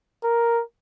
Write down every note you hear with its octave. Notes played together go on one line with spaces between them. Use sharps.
A#4